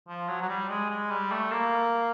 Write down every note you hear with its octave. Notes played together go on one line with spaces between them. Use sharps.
F3
F#3
F#3
G3
G#3
G#3
G3
A3
A#3